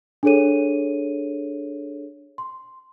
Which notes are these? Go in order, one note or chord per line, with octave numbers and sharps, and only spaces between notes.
D4 G#4 A4 C#5 D#7
C6